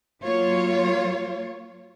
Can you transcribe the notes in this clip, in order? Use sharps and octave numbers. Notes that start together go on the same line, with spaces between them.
F#3 A#3 F4 C#5